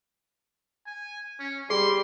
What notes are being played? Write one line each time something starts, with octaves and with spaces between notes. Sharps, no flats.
G#5
C#4
G3 G#4 C6